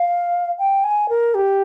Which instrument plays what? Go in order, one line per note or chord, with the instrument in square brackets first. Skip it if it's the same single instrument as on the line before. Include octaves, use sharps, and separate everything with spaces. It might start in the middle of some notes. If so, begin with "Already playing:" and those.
Already playing: [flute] F5
G5
G#5
A#4
G4